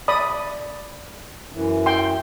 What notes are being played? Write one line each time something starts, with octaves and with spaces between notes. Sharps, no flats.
D5 B5 D#6
F#2 E3
G5 C6